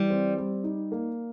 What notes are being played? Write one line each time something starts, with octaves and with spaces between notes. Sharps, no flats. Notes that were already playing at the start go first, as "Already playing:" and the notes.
Already playing: E3 G3
C4
G3
D#4
A#3